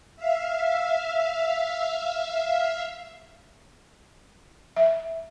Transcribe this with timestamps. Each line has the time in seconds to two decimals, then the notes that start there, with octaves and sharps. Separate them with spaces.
0.16 E5 F5
4.76 E5